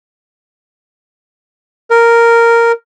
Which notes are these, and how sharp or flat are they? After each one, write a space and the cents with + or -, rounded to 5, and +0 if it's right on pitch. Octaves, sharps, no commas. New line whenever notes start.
A#4 -5